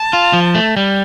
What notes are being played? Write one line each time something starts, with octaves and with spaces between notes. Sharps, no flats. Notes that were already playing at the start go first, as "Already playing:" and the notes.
Already playing: A5
F4
F3
A3
G3